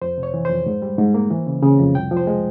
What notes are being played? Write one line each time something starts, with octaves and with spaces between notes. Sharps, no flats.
F2 C5
C3
C#5
E3
C5
F2
G#2
G3
G#2
A#3
E3
C#3
C#3
F2
C2 G5
F3
C5
G#3